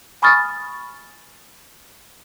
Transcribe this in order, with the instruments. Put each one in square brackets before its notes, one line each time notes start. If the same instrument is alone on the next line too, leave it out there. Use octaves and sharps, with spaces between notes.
[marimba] G#5 B5 C#6 D#6 F6 A6